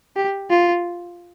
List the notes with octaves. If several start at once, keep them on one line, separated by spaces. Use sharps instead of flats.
G4
F4